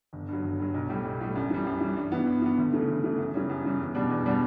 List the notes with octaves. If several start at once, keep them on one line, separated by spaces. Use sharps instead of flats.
G1
G2 F#3
G1
G2 F#3
B1
A2 G3
B1
A2 G3
F#2
E3 G3
F#2
E3 G3
G2
E3 B3
G2
E3 B3
D2
C#3 E3 A3
D2
C#3 E3 A3
F#2
C#3 E3 G3 C#4
F#2
C#3 E3 G3 C#4
E2
B2 G3 D4
E2
B2 G3 D4